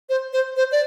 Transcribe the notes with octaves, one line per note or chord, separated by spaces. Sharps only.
C5
C5
C5
D5